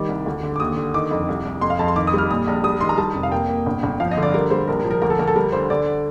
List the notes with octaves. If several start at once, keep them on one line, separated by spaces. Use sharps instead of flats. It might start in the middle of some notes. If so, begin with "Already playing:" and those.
Already playing: D#3 G3 D6
C2
D2
D3
D6
D#2 D#6
D3
D#3 D6
F2
C2
C2
F2 C6
F5
F2 A5
C6
D#3 D6
D#6
G3 F6
A#2 D#6
A#1
G3 D#6
D#3 C6
A#5
G3 A5
F1
F5
A#3 G5
A#3
G1
G1
F3 F5
D#5
D3
D5
G3 A#4
G3 C5
A#1 A#4
A#4
F3
A#4
D2 A#4
A4
D2 A#4
A4
G3 A#4
D3 C5
D3 D5